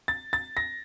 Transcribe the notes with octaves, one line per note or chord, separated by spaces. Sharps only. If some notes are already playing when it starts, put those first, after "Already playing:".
A6
A6
A#6